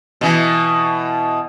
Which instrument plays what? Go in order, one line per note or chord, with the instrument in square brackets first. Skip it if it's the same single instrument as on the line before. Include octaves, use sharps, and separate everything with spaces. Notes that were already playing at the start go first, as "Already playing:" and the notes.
[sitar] B2 E3